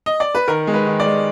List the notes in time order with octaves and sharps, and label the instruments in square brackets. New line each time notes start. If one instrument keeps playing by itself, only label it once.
[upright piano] D#5
D5
B4
D#3 A#4
G#3
B4
D#3
D5
G#3